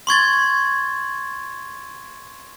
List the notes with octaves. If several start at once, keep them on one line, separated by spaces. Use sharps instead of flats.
C6 C#6 G#6 A6